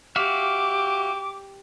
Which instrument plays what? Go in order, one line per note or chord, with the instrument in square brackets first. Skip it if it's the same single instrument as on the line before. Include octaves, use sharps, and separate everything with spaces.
[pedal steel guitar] F#4 E5 F5 [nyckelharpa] G4 [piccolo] D6